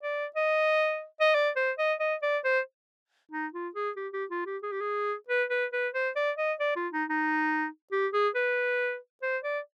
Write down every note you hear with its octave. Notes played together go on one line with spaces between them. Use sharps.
D5
D#5
D#5
D5
C5
D#5
D#5
D5
C5
D#4
F4
G#4
G4
G4
F4
G4
G#4
G4
G#4
B4
B4
B4
C5
D5
D#5
D5
F4
D#4
D#4
G4
G#4
B4
C5
D5